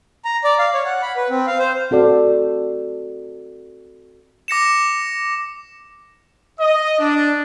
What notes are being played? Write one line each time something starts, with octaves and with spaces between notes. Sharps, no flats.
A#5
D5
F5
C#5
F#5
B5
B4
C4
F5
C5
C4 F#4 A4 D5
D6 A#6 C#7 E7
D#5
D4